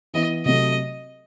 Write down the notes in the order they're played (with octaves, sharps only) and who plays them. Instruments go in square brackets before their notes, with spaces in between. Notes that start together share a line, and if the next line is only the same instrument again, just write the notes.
[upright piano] E3 B3 E4 [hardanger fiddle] D#5
[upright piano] C3 F#3 A3 [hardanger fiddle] D#5